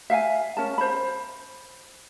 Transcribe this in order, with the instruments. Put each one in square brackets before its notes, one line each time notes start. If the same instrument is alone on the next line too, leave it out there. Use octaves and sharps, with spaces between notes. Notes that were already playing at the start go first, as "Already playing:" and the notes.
[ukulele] E5 F5 G5 G#5
C#4 A#4 A5
C5 B5